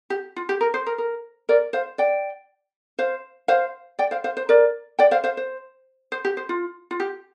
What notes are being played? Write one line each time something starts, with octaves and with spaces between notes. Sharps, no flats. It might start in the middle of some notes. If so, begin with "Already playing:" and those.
G4
F4
G4
A#4
C5
A#4
A#4
A#4 D5
C5 F5
D5 G5
C5 F5
C5 F5
D5 G5
C5 F5
C5 F5
C5
A#4 D5
D5 G5
C5 F5
C5 F5
C5
C5
G4
C5
F4
F4
G4